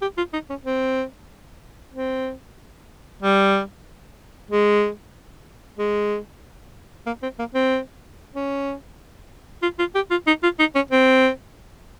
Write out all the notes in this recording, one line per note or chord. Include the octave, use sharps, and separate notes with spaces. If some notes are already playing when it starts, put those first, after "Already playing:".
G4
F4
D#4
C#4
C4
C4
G3
G#3
G#3
A#3
C4
A#3
C4
C#4
F4
F4
G4
F4
D#4
F4
D#4
C#4
C4